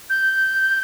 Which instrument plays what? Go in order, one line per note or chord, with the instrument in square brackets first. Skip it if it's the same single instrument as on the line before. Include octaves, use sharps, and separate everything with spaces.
[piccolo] G6